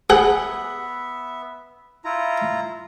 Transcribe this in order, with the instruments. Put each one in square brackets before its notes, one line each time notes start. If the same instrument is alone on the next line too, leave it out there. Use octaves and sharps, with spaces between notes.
[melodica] B3 E5 [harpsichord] G#4 [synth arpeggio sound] F#5
[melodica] E4 F4 A#5